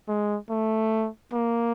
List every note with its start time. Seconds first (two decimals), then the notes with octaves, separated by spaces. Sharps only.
0.08 G#3
0.50 A3
1.33 A#3